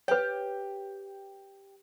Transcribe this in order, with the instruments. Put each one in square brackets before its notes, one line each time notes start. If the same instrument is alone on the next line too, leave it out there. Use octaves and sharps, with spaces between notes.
[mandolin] G4 [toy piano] B4 C#5